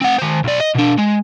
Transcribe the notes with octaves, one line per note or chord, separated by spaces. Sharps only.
C4 F#5
D#3 C5
B1 D5
D#5
B2 D4
G#3